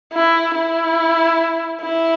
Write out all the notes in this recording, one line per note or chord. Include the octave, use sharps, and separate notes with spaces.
E4
E4
E4